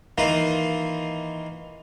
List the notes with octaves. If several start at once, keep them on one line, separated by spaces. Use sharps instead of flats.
D#3 E3 A#3 F4 F5